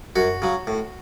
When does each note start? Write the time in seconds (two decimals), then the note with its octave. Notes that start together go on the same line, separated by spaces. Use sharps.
0.16 F#2 F#4
0.42 C#3 F#3
0.67 A2